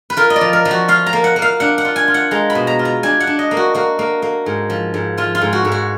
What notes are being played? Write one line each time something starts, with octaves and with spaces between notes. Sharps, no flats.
B4
F4 A#4
D#5
D5
F3
A#4
F3
F#4
F4 F5
A#5
A#3
F#5
A#3
F5
D4 F#5
F#5
F4
G#5
F4
F#5
G#3 A#5
B5
B2
A#5
F4
A#5
D4 G#5
F#5
D4
D#5
A#3
F#4
A#3 F#4
A#3
A#3
G#2
F3
G#2
F3 F4
F4
G#2
F#4
G#2
F#4